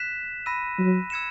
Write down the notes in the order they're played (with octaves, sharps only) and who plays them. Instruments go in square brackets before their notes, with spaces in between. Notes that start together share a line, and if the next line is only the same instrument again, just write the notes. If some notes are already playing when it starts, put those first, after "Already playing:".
Already playing: [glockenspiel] F#6 B6 E7
B5 E6 A#6 D#7
[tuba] F#3
[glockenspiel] E6 G#6 C#7 E7